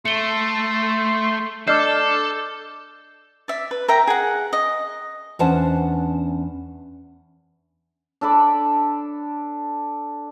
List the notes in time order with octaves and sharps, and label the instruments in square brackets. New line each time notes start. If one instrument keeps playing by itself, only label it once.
[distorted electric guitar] A3 [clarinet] C6 [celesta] C#7 G7
[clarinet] D4 [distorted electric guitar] A4 [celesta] D5 D#5 C7 [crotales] D6 F6 G6
[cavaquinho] D5 E5
B4
A#4 E5 G5 A#5
G#4 F#5
D#5
[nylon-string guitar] E2 C#4 D4 C5 F#5 A5
[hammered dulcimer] D4 A4 B5 D6